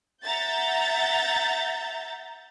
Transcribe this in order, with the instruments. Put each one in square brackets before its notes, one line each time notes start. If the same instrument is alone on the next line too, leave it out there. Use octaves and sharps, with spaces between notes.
[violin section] E5 F#5 A#5 G6 A6